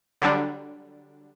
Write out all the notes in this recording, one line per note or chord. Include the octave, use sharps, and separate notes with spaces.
D3 F#3 G3 D4